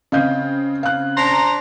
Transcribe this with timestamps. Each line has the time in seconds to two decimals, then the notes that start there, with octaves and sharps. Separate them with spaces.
0.12 C#3 C4 D#5 F5 G6
0.83 F5 F#6
1.17 D4 C5 A#5